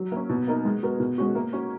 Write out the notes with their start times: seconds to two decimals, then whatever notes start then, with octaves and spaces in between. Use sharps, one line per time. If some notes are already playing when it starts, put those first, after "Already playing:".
Already playing: F#3
0.12 A#3 C#4
0.29 B2
0.47 A#3 D#4 A#4
0.65 G#3
0.83 B3 F#4 A#4
1.00 B2
1.18 G#3 C#4 F#4
1.35 A#3
1.53 C#4 F#4